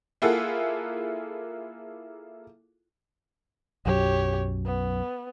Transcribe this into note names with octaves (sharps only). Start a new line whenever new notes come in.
A#3 E4 F4 G#4 A4 F#5
B1 F#2 F#3 G4 C#5
B3